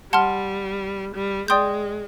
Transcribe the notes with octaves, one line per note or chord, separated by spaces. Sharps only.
G3 F#5 A5 C6 F6
G3
G#3 D5 G5 C6 D#6 G6